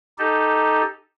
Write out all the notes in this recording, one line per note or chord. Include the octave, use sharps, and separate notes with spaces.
D#4 G4 A4